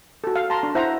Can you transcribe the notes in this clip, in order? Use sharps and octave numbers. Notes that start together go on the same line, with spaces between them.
F#4 A4
F5
A5 A#5 C6
D4
E4 C5 E5 F#5 A#5